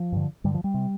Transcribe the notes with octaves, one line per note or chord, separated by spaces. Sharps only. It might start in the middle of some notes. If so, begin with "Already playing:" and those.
Already playing: F3
G2 D3
G2 D3 G3
F3
G3
C3